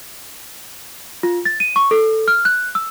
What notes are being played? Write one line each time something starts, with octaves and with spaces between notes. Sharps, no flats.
F4
A6
D#7
C#6
A4
F6
F#6
E6